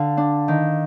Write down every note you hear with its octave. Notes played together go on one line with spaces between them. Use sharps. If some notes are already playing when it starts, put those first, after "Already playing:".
Already playing: D3 F5
D4
D#3